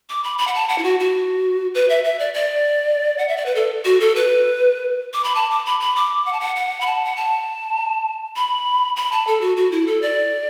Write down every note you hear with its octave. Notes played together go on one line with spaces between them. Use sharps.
D6
B5
B5
F#5
A5
F#5
E4
F#4
F#4
B4
E5
E5
D5
D5
F#5
E5
D5
B4
A4
F#4
A4
B4
D6
B5
A5
D6
B5
B5
D6
F#5
A5
F#5
F#5
B5
A5
F#5
A5
B5
B5
A5
A4
F#4
F#4
E4
A4
D5